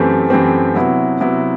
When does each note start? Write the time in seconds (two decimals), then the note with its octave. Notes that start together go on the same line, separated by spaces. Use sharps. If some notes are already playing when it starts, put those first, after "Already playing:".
Already playing: F#2 E3 A3 C4 G4
0.30 F#2 E3 A3 C4 G4
0.75 C3 F#3 B3 E4
1.20 C3 F#3 B3 E4